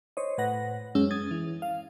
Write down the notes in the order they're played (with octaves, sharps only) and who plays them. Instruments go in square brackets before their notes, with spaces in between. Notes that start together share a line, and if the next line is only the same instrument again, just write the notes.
[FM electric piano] C5 C#5 D#5
A2 B4 F#5 A#6
F#2 G#3 C#4 E6
D#6 G#6 A6
E3
F5